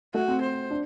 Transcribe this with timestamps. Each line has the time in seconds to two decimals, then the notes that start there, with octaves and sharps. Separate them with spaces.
0.14 A3 F#4
0.28 C4
0.43 C5
0.70 D4